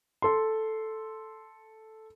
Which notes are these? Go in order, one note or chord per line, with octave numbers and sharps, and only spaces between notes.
A4 C6